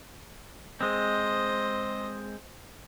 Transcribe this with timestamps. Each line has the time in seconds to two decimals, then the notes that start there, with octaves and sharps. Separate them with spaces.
0.81 G#3 C4 C5 D#5